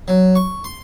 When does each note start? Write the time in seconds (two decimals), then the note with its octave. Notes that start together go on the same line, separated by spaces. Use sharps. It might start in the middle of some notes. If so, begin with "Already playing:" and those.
0.08 F#3
0.35 C#6
0.64 C6